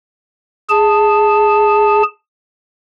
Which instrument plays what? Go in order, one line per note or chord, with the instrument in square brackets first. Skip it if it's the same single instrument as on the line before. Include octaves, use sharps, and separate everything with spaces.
[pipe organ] G#4 A5